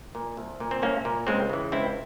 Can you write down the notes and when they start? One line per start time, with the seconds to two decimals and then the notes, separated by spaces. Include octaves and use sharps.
0.15 A#2
0.37 C2
0.60 A#2
0.71 C4
0.82 C2 A#3 C#4
1.05 A#2
1.27 C#2 G#3 C4
1.50 C#3 E3
1.72 C#2 C4 E4